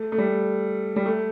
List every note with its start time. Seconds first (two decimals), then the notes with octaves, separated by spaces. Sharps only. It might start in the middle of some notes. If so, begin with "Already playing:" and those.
Already playing: A3
0.12 A3
0.18 G3
0.96 G3
1.06 A3